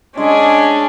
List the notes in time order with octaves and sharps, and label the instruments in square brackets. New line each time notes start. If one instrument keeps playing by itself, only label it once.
[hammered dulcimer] G#3 [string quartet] C#4 D4 G#4